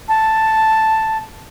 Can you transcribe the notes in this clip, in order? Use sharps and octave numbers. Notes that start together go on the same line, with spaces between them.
A5